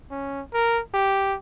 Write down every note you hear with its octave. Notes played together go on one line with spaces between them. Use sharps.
C#4
A#4
G4